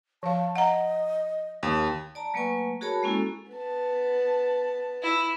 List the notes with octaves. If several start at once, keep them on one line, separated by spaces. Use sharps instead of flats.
F3 F5 A5
D#5 F#5 A#5
D#2
D5 A5 A#5
F#3 A3 A#3 B4 G#5 C#6
F#4 G#4 A#4 C#5 A5 B5
G#3 A#3 C#4 E4 F#4 A4
B3 A5
E4